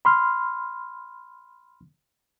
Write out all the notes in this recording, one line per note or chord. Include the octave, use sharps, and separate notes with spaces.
B5 C6 F6